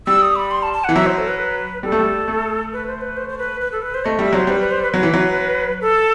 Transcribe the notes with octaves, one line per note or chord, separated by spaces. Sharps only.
G3 E6
D#6
B5
C6
A5
A5
E3 F#5
F#3 E5
C5
A4
B4
G3 A4
A3
G3
A3
B4
C5
B4
C5
C5
B4
B4
A4
B4
C5
A3 D#5
G3 E5
F#3 C5
G3 B4
B4
C5
B4
F#3 B4
E3
F#3
A4